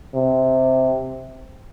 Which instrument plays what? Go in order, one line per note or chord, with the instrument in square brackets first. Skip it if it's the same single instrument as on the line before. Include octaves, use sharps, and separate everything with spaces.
[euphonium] C3